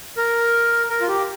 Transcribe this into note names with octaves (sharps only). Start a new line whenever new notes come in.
A#4
A#4
F4
G4